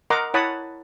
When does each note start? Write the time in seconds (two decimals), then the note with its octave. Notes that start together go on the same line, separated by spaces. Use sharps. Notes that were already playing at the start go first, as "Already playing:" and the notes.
0.10 A#4 D#5 F#5 A#5 C6 D6
0.34 E4 C#5 F#5 A5 B5 D#6